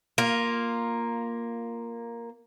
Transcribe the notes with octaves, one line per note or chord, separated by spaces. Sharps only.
A#3 F4